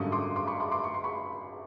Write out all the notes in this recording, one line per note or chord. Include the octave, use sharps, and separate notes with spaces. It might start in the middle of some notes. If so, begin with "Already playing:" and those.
Already playing: G#1 F#2 D3 G3 C#6 D#6
C6 D6
C6 D6
B5 C#6
C6 D6
C6 D6
C#6
C6
B5 C#6